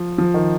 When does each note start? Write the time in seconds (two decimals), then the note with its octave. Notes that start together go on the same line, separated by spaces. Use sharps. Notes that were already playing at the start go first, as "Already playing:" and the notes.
Already playing: F3
0.18 F3
0.34 D#3